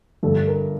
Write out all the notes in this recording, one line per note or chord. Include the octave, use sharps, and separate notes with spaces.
G1 G2 D3 A4
A#4